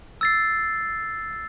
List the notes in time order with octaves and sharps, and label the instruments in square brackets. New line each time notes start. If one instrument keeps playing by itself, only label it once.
[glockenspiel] E6 A6 C7